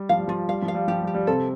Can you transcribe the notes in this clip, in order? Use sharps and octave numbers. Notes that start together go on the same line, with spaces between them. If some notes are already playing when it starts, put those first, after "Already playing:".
Already playing: G3
F3 F5
G3
F3 F4
G3 F5
F3
F5
G3
F3 G4
G3
G4
G3
C3 C4 A4